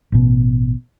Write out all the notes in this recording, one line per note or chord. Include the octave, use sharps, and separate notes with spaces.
A1 B2